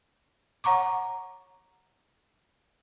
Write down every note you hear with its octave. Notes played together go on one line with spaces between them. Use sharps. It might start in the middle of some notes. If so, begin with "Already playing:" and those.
C#5 F#5 A#5 C#6 D6